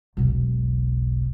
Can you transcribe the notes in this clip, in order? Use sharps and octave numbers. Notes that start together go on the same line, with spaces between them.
E1 B1